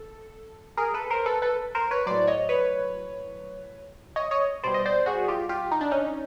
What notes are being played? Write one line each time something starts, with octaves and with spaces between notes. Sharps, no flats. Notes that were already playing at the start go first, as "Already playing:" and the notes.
Already playing: A4
G#4 A#4
A4 B4
A#4 C5
A4 B4
A4 B4
A#4 C5
B4 C#5
A2 F#3 C5 D5
C#5 D#5
B4 C#5
C#5 D#5
C#5 D#5
B2 G3 C5 D5
D#5
C5 D5
F#4 G#4
F4 G4
F4 G4
D#4
D4
C#4 D#4